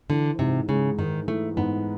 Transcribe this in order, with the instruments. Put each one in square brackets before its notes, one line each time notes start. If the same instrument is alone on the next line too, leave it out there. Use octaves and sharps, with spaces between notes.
[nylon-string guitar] D3 [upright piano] E3
[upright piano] G#2 [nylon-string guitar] C3
[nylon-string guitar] C#3 [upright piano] G#3
[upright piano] G#2 [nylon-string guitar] D#3
[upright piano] E3 [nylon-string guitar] A3
[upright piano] G#2 [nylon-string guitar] B3